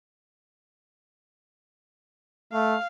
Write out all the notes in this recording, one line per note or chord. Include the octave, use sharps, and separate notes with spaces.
A3 F5